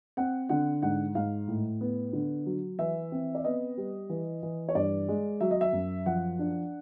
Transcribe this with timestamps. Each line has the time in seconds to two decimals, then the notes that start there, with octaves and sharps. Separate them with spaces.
0.17 C4 F#5
0.49 D3 F#5
0.82 G#2 F#5
1.15 G#2 F5
1.48 A2
1.81 B3
2.13 D3
2.46 F#3
2.79 E3 E5
3.12 C4
3.35 D5
3.44 B3 D#5
3.77 G3
4.09 E3
4.43 E3
4.69 C#5
4.75 G2 D5
5.08 G#3
5.41 F#3 E5
5.51 D#5
5.61 E5
5.73 F#2
6.06 F3 F#5
6.39 D4